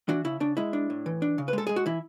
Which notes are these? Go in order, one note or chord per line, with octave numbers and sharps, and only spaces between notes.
E3 D4 F#4
C#3 E4
C#3 D4
G#3 E4
D4
A2
E3
D4
C#3
B4
G#3 A4
G#3 G#4
F#4
E3 E4